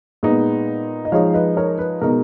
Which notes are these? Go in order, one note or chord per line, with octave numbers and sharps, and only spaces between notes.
A#2 G#3 B3 D#4
D#5
F3 G#3 D#4 C#5 F5
B4 D#5
A#4 C#5
B4
B2 G#3 D#4 A#4